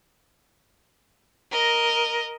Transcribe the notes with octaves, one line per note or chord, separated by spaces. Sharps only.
A#4 D#5